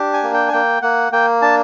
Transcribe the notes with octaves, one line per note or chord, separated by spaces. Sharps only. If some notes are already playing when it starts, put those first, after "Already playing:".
Already playing: D4 G4
G#5
A#3
G5
G#5
A#3 G5
A#3 F#5
A#3 G5
D4 A5